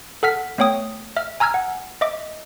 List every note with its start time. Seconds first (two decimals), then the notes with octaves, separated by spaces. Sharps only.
0.23 A4 F#5 F6 B6
0.58 A3 B3 C#5 G5 D#6
1.17 E5 F6
1.40 G#5 A#5 E6 F6 G#6
1.54 F#5
2.01 D#5 E5 D6